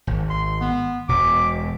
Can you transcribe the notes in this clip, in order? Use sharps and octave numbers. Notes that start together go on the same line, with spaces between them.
G#1
C6
B3
E1 B2 D6